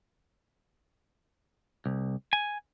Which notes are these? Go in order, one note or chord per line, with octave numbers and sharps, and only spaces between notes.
C2
G#5